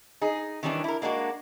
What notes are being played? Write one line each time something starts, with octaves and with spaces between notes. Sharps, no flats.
D#4 G#4
D#3 E3 G3 C#4 D4
E4 A#4
G#3 A#3 D4 E4 F#4